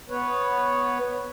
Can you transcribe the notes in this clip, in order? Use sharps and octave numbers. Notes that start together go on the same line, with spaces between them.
B3 B4 C#5